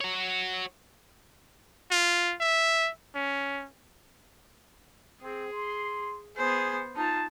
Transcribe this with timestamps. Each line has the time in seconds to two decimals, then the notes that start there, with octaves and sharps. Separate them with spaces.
0.01 F#4 C#5
1.91 F4
2.40 E5
3.15 C#4
5.22 C4 G#4
5.52 C6
6.37 B3 G#4 C5
6.96 D#4 F4 A5